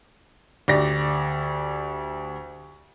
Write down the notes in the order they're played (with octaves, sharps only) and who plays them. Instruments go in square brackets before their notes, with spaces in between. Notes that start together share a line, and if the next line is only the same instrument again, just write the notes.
[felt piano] D2 G4 D5 A#6